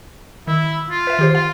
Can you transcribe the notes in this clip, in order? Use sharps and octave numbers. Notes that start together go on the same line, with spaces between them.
D#3 E4
F4
B4 E5
D#3 G4 C5
F4 F5